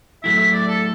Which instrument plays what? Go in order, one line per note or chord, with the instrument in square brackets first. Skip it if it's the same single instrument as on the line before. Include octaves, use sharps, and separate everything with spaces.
[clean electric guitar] A2 F#3 A3 E4 [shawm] E5
[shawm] E5
D5
A4